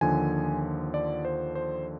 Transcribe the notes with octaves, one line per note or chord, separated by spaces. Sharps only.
D#2 D3 F3 G#5
D5
C5
C5